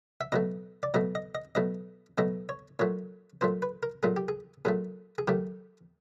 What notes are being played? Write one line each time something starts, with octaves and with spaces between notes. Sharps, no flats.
E5
B2 F#3 A3 D#5
D5
B2 F#3 A3 D#5
D#5
D#5
B2 F#3 A3 D#5
B2 F#3 A3 D#5
C#5
A#2 F#3 A3 C#5
A#2 F#3 A3 C5
B4
A#4
A#2 F#3 A3 G#4
G4
G#4
A#2 F#3 A3 G#4
G#4
D#3 F#3 A3 G4